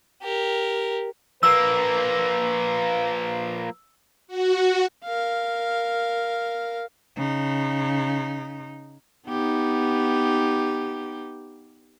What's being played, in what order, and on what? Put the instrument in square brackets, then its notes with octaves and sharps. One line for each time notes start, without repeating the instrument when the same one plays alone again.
[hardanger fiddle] G4 A#4
[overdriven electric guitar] F3 A#3 [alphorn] B4 [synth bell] E6
[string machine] F#4
[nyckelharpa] A#4 F5
[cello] C#3 D#4
[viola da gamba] B3 D#4 G4